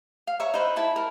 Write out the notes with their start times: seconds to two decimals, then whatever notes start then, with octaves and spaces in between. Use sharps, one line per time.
0.27 F5
0.40 C#5 E5 A#5 C#6
0.54 D#4 B4 C5
0.76 E4 A5 B5
0.96 A#4